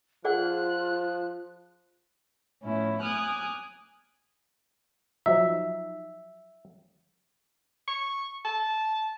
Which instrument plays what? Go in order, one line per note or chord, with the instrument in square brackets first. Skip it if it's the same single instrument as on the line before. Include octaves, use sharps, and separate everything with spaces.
[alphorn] F3 [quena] F4 [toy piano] G#4 D5 F#5 [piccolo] F#6
[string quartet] A2 F3 B3 C#4 E4
G#5 D6 D#6 F6 F#6
[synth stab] F3 F#3 D#4 [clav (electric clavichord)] E5
[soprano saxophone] C#6
A5